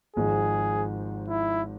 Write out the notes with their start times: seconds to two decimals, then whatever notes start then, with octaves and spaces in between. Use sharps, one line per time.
0.16 G#1 G#2 F3 G#3 G#4
1.28 E4